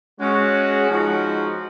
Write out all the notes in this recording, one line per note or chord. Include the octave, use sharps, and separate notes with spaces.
G#3 C#4 F#4
F3 G#3 D#4 F#4